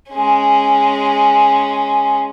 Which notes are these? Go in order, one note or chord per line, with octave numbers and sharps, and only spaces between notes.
G#3 C#4